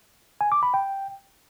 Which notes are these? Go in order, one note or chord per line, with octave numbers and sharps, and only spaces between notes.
G#5
D6
B5
G5